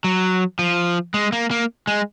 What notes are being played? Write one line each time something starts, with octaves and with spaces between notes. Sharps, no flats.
F#3
F3
G#3
A#3
A#3
G#3